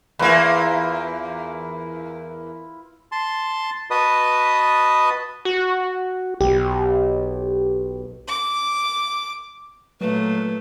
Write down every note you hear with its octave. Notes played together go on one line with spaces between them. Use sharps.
E2 A#3 E4 F4 B4
A5 C6
F#4 B4 D#5 A5 D#6
F#4
B1 G4
D6
A#2 F#3 A3 B4